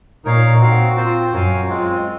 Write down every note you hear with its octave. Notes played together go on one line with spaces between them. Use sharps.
A#2 D#4 A#4 C#5 F5
C4 F#4 A#4 F5
C4 F4 C5
F#2 F#4 A#4 C#5 F5 G#5
G#3 C4 F4